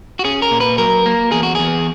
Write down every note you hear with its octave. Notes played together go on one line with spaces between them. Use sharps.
F#4
C#4 G#4
A#4
A#2
B4
F#3 A#4
A#3
E2 G#4
F#4
E2 G#4